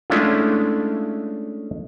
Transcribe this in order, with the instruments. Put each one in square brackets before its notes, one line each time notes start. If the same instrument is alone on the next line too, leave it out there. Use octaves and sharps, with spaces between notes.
[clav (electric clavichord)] G#3 A3 C#4 D4 E4 F4